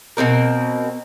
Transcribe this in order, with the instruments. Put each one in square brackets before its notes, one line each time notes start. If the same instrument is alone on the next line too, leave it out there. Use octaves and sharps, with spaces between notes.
[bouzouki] B2 G3 C4 A#4